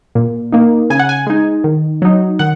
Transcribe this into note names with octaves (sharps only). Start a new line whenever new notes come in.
A#2
A#3 D#4
C#3 G#5
F#5
G#5
G#3 D#4
D#3
F#3 D#4
D#3 F#5